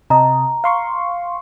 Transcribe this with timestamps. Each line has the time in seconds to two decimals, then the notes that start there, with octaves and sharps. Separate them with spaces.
0.10 C3 D#5 A5 A#5
0.64 F5 C6 C#6